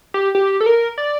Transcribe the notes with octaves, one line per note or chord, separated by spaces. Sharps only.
G4
G4
A4
A#4
D5